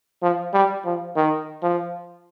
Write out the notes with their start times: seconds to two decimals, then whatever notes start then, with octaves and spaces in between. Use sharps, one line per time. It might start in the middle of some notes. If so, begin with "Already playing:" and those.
0.22 F3
0.53 G3
0.85 F3
1.16 D#3
1.63 F3